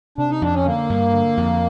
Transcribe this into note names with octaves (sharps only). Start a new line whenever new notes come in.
C3 D4
D#4
F2 D4
C#4
D3 A#3
G2
D3
F2